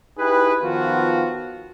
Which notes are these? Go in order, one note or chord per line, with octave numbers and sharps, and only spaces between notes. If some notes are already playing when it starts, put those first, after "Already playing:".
D#4 E4 G4 G#4 B4
D#3 F3 B3 F4 F#4